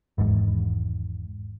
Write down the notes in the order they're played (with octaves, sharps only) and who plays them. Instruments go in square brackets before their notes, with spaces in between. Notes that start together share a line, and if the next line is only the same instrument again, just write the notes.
[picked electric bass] G#1 E2 G#2